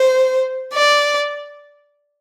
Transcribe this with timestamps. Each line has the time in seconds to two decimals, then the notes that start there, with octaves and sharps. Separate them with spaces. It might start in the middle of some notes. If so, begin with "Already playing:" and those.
Already playing: C5
0.74 D5